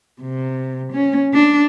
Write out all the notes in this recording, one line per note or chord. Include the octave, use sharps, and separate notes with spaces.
C3
C#4
D4